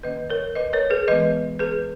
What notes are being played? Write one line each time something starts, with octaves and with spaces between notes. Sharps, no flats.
D#3 A#3 C#4 B4 D#5
A#4 C#5
B4 D#5
A#4 C#5
G#4 B4
E3 G#3 B3 B4 D#5
G#4 B4